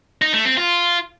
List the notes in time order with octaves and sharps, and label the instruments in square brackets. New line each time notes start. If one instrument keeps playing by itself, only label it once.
[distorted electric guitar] D#4
A3
C4
F4